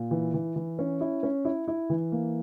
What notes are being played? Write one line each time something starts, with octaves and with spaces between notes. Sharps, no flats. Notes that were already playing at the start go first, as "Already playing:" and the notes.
Already playing: A#2
E3
E3
E3
C#4
E4
C#4
E4
E4
E3
A#3